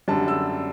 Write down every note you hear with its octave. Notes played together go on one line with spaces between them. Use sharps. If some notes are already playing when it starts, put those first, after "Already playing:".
F#2 D3 G3 A5
E6